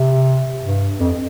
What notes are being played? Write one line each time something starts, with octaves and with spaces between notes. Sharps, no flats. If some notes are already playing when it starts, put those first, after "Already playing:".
Already playing: C3
G2
F2